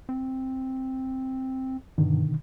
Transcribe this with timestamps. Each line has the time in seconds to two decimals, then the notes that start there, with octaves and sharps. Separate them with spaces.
0.09 C4
1.98 G2 B2 D3 D#3